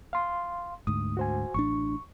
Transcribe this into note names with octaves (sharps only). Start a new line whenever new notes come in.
F5 C6
D2 G#2 D#6
F#4 C5 G#5
A1 A2 D4 C#6